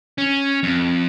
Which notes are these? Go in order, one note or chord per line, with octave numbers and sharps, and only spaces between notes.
C#4
F2